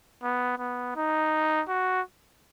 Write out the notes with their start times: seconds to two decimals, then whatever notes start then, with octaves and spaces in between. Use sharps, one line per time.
0.23 B3
0.58 B3
0.96 D#4
1.68 F#4